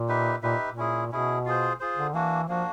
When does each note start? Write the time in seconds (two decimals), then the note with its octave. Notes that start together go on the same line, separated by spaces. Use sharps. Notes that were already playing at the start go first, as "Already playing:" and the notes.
Already playing: A#2
0.08 D#4 G4 B4 E5
0.42 A#2 D#4 G4 B4 E5
0.68 A#2
0.77 C#4 E4 G#4
1.11 B2 C#4 E4 G#4
1.46 F4 G#4 C5
1.80 F4 G#4 C5
1.96 D3
2.13 E3 A#3 D4 F#4
2.48 F3 A#3 D4 F#4